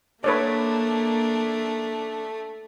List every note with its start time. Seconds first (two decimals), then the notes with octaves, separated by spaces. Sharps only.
0.24 A3 A#3 D4 B4 C#5 D5